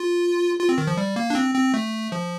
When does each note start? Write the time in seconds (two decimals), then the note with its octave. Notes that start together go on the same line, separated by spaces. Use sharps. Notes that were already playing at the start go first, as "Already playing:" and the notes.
Already playing: F4
0.59 F4
0.69 C4
0.78 D#3
0.87 F3
0.97 G3
1.16 A#3
1.30 D4
1.35 C4
1.55 C4
1.74 A3
2.12 F3